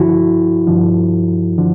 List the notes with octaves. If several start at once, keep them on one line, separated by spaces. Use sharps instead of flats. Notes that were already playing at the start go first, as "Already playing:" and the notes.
Already playing: G2 D3 F3 E4 F#4
G2 D3 F3
D3 F3